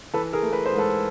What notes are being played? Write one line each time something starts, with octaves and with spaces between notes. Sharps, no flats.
E3 A4 B4
G#4 A#4
A3
B4
C5
G#2
A4 B4